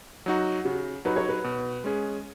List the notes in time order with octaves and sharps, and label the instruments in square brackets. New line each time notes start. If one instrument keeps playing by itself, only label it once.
[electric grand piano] F#3 D#4 F#4
[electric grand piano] C#3 [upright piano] F#4
[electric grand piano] F#3 D#4 F#4 [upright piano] B4
[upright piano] C#5
B4
[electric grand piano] B2
G#3 C#4 G#4